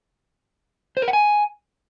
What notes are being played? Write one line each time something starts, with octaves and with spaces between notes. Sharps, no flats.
C5
A#4
F#5
G#5